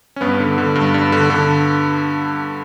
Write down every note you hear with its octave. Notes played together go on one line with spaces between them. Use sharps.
C#4
G2 B3
D3
D3
G2
G2
D3
D3